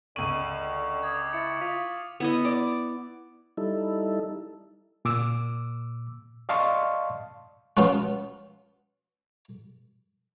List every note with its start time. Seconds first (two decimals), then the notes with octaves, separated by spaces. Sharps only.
0.16 C#2 D3 C#6 D#7 F#7
1.03 D6 D#6 G#6
1.33 E4 A6 C#7
1.61 F4 D#6 B6
2.20 B3 E4 D#5
2.45 D5
3.57 G3 D#4 E4 A4
5.05 A#2 D6 E6
6.49 D5 D#5 F5 A5 C6 C#6
7.77 F3 B3 C#4 F4 F#4